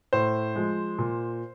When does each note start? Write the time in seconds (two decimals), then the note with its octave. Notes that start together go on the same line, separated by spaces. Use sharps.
0.13 A2 C5
0.55 F3 G#3
0.98 A#2